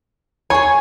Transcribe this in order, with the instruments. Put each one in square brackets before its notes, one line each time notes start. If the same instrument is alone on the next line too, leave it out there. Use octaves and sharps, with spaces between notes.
[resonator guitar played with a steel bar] G#4 C#5 [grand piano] G#5